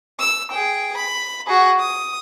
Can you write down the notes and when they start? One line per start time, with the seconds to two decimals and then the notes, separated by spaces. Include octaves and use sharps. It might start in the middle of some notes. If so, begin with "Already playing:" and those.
0.20 E6
0.52 G#4 G5
0.97 B5
1.47 F#4 G#4
1.80 D#6